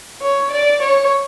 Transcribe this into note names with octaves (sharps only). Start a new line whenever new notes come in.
C#5
D5
C#5